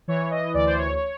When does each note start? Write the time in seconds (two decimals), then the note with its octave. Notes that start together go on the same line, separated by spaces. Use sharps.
0.08 E3 C#5
0.31 D#5
0.54 D2 D5
0.66 C5
0.77 C#5